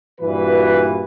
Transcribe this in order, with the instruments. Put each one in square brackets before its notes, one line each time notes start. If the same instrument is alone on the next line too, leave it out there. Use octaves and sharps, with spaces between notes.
[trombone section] G2 A#2 E3 [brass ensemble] F#4 B4